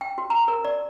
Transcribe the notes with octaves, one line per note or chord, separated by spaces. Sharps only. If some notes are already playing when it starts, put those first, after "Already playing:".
G5
F#4
A#5
A#4
D5